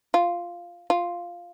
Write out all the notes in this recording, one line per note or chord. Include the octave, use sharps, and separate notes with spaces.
F4
F4